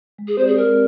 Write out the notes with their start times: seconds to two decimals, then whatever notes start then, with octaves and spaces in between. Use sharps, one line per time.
0.18 G#3
0.28 G#4
0.37 C4 G4 C5 D5
0.47 G#4
0.57 G#3 A#4